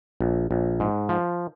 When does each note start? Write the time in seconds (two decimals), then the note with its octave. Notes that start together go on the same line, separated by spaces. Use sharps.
0.21 A#1
0.51 A#1
0.80 G#2
1.09 F3